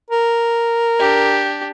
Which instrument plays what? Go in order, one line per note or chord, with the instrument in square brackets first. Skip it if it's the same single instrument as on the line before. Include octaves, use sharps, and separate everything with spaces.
[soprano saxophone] A#4
[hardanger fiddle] D4 G4